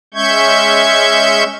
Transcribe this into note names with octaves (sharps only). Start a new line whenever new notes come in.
G#3 C#4 E5 C#6 G6 G#6